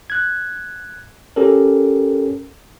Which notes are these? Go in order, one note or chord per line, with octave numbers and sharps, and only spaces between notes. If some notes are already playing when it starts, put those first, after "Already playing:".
F#6 G#6
C#4 G4 A4 A#4